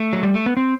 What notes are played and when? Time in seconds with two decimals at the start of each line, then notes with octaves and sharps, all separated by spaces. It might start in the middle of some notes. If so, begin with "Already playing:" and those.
Already playing: A3
0.13 F#3
0.23 G3
0.34 A3
0.46 B3
0.57 C4